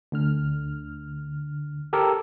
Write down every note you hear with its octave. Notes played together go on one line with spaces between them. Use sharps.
D2 D3 F6
G4 A4 A#4